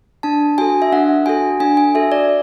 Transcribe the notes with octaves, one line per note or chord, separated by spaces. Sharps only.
D4 A5
F#4 A4 G#5
E5
D4 F#5
F#4 A4 G#5
D4 G#5
G#5
F#4 A4 E5
D5